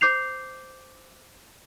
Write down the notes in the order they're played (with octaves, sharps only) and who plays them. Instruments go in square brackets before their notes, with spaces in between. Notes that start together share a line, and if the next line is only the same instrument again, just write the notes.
[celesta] C5 D6 G6 C7 F7